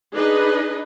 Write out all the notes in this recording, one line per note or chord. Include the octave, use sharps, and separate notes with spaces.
D4 D#4 G#4 B4 D#5